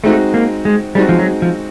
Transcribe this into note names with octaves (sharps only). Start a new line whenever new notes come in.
G#3 A3 C4 D#4 F#4
A#3
G#3
G3 G#3 C4 D#4 F#4
F3
F#3
F3